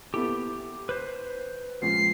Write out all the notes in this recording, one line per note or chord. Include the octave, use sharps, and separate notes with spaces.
B3 E4 G4 A4
B4 C5
C#2 F3 C7